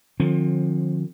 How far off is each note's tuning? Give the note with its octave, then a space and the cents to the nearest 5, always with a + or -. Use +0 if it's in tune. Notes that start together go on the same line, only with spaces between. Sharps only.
D3 +40 F3 +25 C4 +35